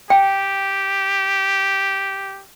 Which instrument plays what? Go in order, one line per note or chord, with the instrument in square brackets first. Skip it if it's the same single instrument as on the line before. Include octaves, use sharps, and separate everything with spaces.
[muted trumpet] G4 [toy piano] G5